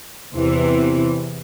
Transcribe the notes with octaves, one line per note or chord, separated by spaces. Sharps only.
E2 C3 E3